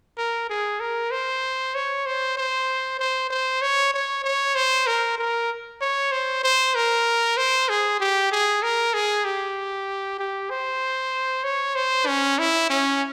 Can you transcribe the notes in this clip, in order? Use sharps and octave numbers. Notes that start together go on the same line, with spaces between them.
A#4
G#4
A#4
C5
C#5
C5
C5
C5
C5
C#5
C#5
C#5
C5
A#4
A#4
C#5
C5
C5
A#4
C5
G#4
G4
G#4
A#4
G#4
G4
G4
C5
C#5
C5
C#4
E4
C#4